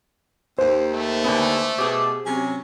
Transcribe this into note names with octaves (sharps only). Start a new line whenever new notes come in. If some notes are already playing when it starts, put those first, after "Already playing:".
D#2 C5
A3
D3 G#3 B3
B2 G4 G#4
C3 F#3 C#4